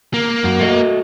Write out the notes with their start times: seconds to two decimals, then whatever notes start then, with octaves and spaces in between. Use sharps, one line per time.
0.14 A#3
0.44 F#2
0.60 A3 F#4 D#5